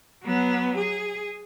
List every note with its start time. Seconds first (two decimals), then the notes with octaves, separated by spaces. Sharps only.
0.24 F#3 B3
0.77 G#4